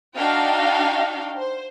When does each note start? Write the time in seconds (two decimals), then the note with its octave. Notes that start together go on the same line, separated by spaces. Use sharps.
0.17 D4 D#4 F#4 F5 G5
1.38 C5